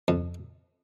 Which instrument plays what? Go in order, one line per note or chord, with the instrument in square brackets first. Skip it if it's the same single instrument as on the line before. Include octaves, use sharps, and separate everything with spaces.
[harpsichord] F2